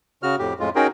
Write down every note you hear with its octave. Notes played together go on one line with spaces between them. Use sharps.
C#3 F#4 F6
F2 A2 G4
F2 A2 G#3 F4
C#4 D#4 F#4 G#4 A#4 G5